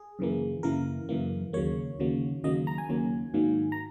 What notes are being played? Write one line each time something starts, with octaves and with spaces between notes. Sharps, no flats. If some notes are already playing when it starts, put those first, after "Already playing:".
Already playing: G#4
F#2 C#3 E3 A#3
F#2 C#3 E3 A#3 A#4
F#2 C#3 E3 A#3
D#2 C#3 F#3 A#3 C#5
D#2 C#3 F#3 A#3
D#2 C#3 F#3 A#3 D#5
A#5
G#5
D#2 C#3 F#3 A#3
G#2 D#3 F#3 A#3
A#5